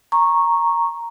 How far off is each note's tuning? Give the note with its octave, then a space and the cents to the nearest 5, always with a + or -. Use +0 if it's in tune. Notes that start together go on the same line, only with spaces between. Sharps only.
A#5 +0 C#6 -10